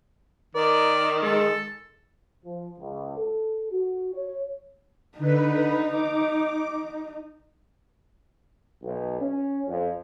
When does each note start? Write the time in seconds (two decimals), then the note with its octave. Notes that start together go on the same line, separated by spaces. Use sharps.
0.55 D#3 A#4 D5
1.23 G#3 A4
2.45 F3
2.79 C#2
3.17 A4
3.71 F#4
4.14 C#5
5.18 D3 D#4 B4
5.90 D6
8.82 B1
9.19 C#4
9.68 F2